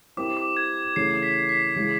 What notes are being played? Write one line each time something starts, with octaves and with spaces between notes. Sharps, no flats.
G3 C4 E4 G4 A#4 D6
D6
G#6
C#3 E3 A3 C#4 C7
B6
B6
C#3 E3 G#3 C7